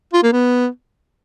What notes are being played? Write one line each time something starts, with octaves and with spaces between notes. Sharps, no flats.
F4
A#3
B3